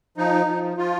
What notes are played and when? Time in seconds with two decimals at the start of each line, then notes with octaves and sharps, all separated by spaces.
0.17 F3 D#4
0.47 F3
0.77 F3 F4